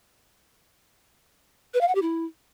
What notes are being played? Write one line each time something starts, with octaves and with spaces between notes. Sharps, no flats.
B4
F5
F#5
G4
E4